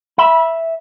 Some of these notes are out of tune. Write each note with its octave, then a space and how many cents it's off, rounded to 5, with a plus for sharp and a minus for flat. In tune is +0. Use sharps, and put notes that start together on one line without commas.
E5 +0 B5 -20